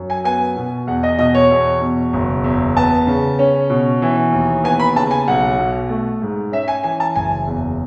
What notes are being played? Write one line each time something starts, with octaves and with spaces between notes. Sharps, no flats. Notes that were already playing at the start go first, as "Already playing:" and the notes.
Already playing: F#2
G#5
B3 G#5
B2
E2 F#5
D#5
B2 D#5
C#5
E2
B2
F#1
E2
B3 A5
C#3
C#4
B2
E3
D#2
B3 G#5
B5
C#3 A5
G#5
B1 F#5
B2
A3
G#2
C#4 E5
G#5
E3 G#5
A5
F#1 G#5
E2